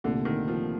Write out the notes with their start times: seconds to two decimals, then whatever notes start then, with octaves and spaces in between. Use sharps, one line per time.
0.04 C2 A#2 D3 A3
0.25 D#3
0.48 F3